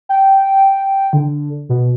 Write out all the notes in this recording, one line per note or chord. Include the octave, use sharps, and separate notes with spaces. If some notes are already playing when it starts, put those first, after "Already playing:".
G5
D3
B2